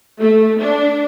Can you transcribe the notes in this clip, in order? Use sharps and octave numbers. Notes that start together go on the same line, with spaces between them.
A3
D4